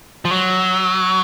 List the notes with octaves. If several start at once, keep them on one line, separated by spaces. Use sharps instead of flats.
F3
F#3